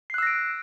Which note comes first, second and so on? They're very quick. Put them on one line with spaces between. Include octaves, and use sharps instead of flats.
C7 F#6 E6 A#6 D7